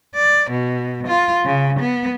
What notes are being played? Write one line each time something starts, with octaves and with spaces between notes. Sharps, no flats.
D5
B2
F4
C#3
B3